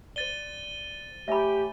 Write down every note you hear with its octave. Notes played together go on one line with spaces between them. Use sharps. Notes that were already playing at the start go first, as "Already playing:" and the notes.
C5 D5 A6 D#7 G7
A3 G4 C#5 E5 G#5 B5